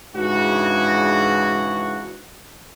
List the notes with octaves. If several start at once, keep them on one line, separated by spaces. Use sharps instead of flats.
G#2 C#3 E3 D4 F#4